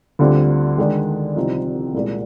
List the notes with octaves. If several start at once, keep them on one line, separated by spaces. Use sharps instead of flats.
D2 D3 G3 C4 F4
D#3 G#3 D4
C2 C3 F3 C4 D#4
C2 A#2 G#3